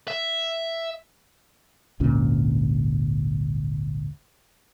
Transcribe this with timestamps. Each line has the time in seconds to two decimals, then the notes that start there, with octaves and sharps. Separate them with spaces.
0.08 E5
2.00 G#1 D2 A#2 C#4